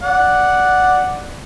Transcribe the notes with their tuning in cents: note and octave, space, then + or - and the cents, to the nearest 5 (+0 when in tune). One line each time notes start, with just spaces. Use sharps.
D5 +0 F#5 +0